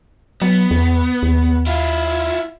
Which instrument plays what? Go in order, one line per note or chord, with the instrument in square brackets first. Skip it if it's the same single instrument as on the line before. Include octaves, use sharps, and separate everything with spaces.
[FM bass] F#3 [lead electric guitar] B3
[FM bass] E2
D#2
[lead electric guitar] E4 F4